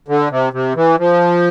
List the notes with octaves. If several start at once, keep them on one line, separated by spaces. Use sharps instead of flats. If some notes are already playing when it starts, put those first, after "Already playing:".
D3
C3
C3
E3
F3